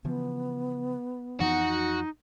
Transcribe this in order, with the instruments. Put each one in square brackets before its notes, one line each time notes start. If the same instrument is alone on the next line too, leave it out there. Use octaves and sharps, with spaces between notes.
[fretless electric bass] C#3 E3 F3 [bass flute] B3
[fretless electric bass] F2 E3 F3 [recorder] D#4 [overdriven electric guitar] F#4